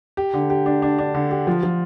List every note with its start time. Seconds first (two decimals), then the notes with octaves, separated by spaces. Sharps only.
0.17 G4
0.34 D3
0.50 G4
0.66 D4
0.82 D4
0.98 D4
1.14 D3
1.31 G4
1.47 F3
1.63 F3